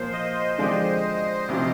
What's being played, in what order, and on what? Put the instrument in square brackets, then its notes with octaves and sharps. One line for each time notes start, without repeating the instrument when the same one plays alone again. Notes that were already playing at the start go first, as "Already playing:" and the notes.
Already playing: [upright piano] A#2 F3 A#3 [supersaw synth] C5
[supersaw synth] D#5
[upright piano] D3 F3 G#3 D4 G4
D2 C3 F3